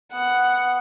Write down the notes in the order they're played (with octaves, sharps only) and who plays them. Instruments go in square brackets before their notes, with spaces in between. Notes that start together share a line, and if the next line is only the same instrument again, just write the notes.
[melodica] B3 [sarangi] F#5